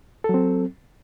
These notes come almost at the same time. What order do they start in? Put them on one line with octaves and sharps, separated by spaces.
A4 F#3 C4